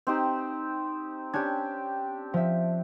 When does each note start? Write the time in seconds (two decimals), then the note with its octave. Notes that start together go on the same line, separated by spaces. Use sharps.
0.07 C4 D#4 G4
1.34 C#4 D4 G4 G#6
2.34 F3 E5